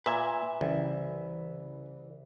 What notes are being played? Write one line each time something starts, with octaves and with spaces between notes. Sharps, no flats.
A#2 B4 E5 G#5
C2 C#3 E3